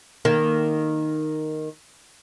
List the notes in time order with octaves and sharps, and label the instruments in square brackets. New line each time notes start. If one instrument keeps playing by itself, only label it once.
[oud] D#3 A#3